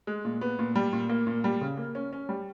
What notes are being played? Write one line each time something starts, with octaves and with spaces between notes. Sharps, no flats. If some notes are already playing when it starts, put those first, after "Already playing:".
G#3
A#2
B3
A#2
G3
A#2
A#3
A#2
G3
C#3
A#3
C#4
C#4
G3